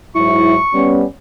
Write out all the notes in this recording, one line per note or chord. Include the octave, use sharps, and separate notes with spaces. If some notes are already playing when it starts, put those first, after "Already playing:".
G#2 F#3 E4 C#6
G3 B3 C#4